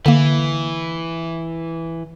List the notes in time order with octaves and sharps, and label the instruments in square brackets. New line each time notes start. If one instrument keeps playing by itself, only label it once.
[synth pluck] D3 A#3 [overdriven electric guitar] E3